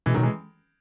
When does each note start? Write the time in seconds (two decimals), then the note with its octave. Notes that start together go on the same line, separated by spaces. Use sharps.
0.06 B2 E3 G#3
0.14 D#3 F#3
0.18 B2
0.23 E3 G#3